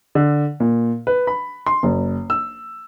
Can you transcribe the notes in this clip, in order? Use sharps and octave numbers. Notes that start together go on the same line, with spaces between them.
D3
A#2
B4
B5
C6
F#1
E6